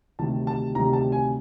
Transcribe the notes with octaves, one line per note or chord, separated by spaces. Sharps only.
D2 C3 D#3 G3 A5
A5
D2 C3 D#3 G3 A#5
A5
G#5